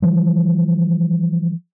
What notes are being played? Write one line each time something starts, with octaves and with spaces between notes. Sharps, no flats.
E3 F3 G3